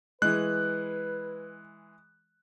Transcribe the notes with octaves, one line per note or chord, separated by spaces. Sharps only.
E3 G#3 B4 F#6